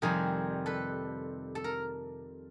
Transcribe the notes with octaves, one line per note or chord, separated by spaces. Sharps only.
F2 C3 D#3 G3 G#4 A#4
A4 B4
A4
A#4